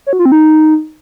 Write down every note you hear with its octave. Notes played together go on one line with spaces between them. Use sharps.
C#5
F#4
F4
C4
D#4